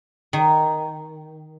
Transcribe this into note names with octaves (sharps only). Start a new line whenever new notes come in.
D#3